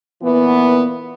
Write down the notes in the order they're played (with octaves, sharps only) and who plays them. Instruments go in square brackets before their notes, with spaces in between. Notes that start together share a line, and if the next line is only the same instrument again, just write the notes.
[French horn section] A#2 E3 B3